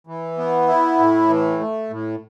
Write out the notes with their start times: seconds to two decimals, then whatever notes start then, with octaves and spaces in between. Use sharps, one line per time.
0.07 E3
0.38 B3
0.67 E4
0.99 A2
1.29 E3
1.60 A3
1.90 A2